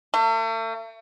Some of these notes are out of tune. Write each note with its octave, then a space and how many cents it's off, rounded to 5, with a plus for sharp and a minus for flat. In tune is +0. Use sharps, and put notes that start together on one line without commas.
A3 +40